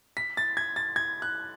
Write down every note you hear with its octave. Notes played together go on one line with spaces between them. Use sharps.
B6
A6
G#6
A6
G#6
F#6